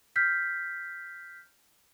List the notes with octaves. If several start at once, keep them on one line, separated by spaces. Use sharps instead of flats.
F6 G6 B6 C7